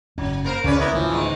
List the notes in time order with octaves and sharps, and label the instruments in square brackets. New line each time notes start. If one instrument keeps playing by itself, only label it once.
[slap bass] F#1 G#2 C#4 [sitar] F#3
[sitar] A#3 A#4 C5
[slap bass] C#2 [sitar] C#3 C#4 B4 [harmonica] D5
[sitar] D#2 [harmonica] B3 E4 A#4
[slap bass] D1 D3 A3 [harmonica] E3 F3
[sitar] E2 G#2 D#3